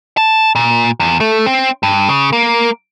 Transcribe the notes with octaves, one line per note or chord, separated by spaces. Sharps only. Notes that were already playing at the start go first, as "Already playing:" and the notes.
A5
A#2
E2
A3
C4
G2
C#3
A#3